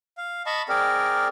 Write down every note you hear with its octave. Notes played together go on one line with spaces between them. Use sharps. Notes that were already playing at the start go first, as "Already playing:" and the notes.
F5
D#5 A5 B5 C#6
C4 G#4 A#4 D5